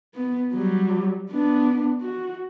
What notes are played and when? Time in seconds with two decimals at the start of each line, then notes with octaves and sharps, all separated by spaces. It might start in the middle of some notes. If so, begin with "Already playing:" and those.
0.14 B3
0.53 F#3 G3
1.31 B3 D4
2.01 F#4